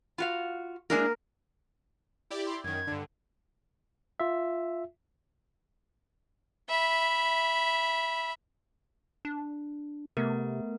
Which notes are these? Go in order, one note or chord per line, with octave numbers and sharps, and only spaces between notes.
F4 F#4 F5
G#3 A#3 D4 E4 A#4
E4 G4 D5
C6
F#2 D#3 G#6
G2 D3
F4 E5
E5 B5
D4
C3 A3 B3 A#4